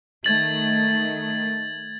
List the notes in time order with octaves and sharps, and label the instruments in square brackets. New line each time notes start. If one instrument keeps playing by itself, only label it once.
[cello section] D#3 A3 [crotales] G#6 A6 F#7